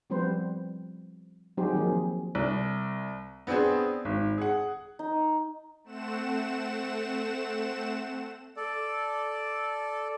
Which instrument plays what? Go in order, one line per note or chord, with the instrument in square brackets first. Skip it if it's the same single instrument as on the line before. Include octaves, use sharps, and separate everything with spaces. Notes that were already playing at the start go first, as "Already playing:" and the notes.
[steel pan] F3 G3 B3 C4 B4 C5
F#3 C4 D#4 G4 G#4 C5
D#3 F3 A#3 C4 G#4
[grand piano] C2
B3 C4 D4 G#4 C5
G#1
G#4 F#5
[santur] D#4
[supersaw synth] A3 C4 F#5 E7
[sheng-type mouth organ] A4 D5